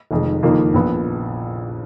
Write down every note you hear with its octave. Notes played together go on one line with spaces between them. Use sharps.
F1 F2 D#3 G#3
F#1 F2 D#3 A#3 F4
A#1 A#2 F3 B3